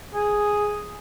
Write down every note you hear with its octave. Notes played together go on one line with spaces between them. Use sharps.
G#4